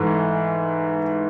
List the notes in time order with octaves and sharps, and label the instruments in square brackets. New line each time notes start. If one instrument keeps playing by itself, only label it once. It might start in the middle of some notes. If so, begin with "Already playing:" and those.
Already playing: [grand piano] G#2 E3 A3